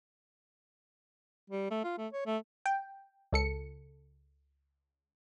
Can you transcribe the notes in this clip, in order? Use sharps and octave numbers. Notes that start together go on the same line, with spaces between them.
G3
A3
F4
A3
C#5
A3
G5
C#2 A4 C#7